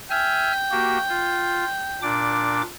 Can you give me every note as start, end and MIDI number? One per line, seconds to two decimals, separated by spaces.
0.11 0.52 76
0.11 2.10 79
0.11 0.52 80
0.11 0.52 89
0.71 0.98 58
0.71 0.98 66
0.71 0.98 67
1.09 1.65 65
2.02 2.62 46
2.02 2.62 62
2.02 2.62 86